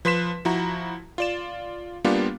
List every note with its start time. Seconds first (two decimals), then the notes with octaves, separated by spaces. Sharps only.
0.05 F3 B4 C6 B6 E7
0.45 F3 E4 F#4 A#5
1.18 F4 D5 E7
2.04 G3 A#3 B3 D4 F4 G4